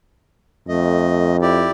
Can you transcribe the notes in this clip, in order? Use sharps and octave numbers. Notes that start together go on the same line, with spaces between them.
F2 A3 D#5
E4 G4 D5